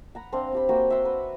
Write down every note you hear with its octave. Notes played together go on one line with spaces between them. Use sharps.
F#5 A#5 B5
C4 D4 F5 C6
C4 G4 B5
A#3 F#4 G5
E5 F#5 C6
B4